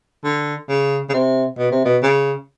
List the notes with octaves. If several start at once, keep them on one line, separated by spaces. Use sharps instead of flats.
D3
C#3
C#3
C3
B2
C3
B2
C#3